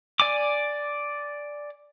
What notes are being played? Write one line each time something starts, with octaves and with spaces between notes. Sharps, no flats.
D5 G#5 D6